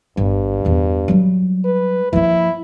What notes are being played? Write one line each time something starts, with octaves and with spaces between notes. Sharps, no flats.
G1 G2
E2 F4
F#3 G3
B4
F3 A#3 E4